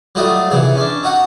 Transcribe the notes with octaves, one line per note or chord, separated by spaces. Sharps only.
F#3 G3 A3 F4 D#5
C3 E3 G#4
C#4 D4
D#4 F#4 F5 F#5